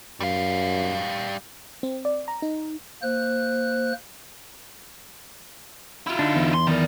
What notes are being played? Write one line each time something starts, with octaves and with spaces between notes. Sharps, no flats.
F#2 G3 F5
C4
D5
A#5
D#4
A#3 C5 F#6
E4 F4
D3 D4 D#4
E2
C6
D#3 F#3 B3 A#4 D5